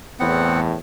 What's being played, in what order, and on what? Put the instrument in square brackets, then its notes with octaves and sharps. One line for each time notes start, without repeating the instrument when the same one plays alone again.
[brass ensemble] E2 A2 [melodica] B3 C4 F#5